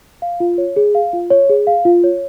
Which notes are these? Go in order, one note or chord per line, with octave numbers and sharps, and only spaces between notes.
F5
F4
C#5
G#4
F5
F4
C#5
G#4
F5
F4
C#5